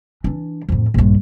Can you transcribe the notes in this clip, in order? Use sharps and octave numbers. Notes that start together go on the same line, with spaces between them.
E3 D4
F2 A2
A#1 G2